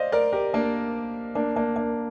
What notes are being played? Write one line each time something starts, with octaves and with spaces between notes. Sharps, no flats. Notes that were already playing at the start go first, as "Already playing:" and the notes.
Already playing: C5 D5 D#5 F5
A#4 D5
G4 A#4
A#3 D4
A#3 D4
A#3 D4
A#3 D4